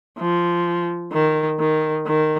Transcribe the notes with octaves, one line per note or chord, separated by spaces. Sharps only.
F3
D#3
D#3
D#3